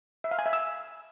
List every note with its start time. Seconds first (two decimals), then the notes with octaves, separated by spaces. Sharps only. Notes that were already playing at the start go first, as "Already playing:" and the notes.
0.24 E5
0.31 F5
0.39 G#5
0.46 E5
0.53 E6